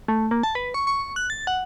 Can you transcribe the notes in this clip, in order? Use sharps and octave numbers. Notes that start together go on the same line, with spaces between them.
A3
A#3
A5
B4
C#6
C#6
F#6
A6
F#5